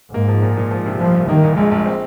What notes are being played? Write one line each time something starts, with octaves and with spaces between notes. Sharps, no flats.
G#2 A#3
F3
A#2
A#2
F3
C3
C2 F3
C2
D#3 A#3
A#2
A#1 G#3
A#1
C4